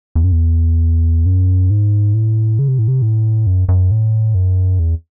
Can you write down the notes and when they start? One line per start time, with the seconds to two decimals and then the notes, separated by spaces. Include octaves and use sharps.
0.15 E2
0.24 F#2
0.32 E2
1.26 F#2
1.70 G#2
2.14 A2
2.59 C#3
2.68 C3
2.79 A2
2.88 C3
3.02 A2
3.47 F#2
3.69 F#2
3.91 A2
4.34 F#2
4.79 E2